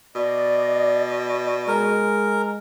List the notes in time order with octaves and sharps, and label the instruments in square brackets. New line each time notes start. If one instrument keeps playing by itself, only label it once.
[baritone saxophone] B2 [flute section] D5 D#5
[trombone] G#3 [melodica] A#4